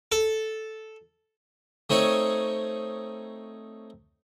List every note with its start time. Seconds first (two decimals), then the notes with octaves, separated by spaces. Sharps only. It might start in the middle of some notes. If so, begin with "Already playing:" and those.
0.12 A4
1.90 A3 C4 D#4 C#5